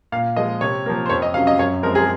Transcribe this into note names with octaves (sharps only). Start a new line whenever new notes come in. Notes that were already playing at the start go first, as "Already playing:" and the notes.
A#2 F5
F3 G#3 D#5
C3 C#5
F3 A#3
C5
F2 C#5
D#5
C3 F#3 C#4 F5
D#5
F#2 C#5
F3 G#3 C4 A#4
G#4